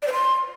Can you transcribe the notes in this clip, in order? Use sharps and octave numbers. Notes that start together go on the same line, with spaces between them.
D5
C5
C6